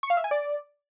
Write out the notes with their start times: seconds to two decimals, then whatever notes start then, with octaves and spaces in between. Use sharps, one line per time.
0.03 C#6
0.10 F5
0.17 E5
0.24 G#5
0.31 D5